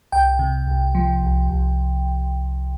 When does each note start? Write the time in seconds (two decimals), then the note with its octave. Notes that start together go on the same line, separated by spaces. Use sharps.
0.12 C2 G5
0.39 C3
0.67 C2
0.95 F3
1.23 C2
1.49 C2